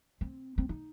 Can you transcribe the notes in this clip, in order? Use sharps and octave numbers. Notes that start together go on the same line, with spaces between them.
C4
C4
D#4